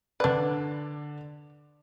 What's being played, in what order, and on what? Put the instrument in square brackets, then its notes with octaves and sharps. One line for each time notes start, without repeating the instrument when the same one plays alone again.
[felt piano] D3 D5 [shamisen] D4 B4